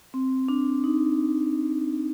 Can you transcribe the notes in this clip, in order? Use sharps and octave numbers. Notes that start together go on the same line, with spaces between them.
C4
D4
D#4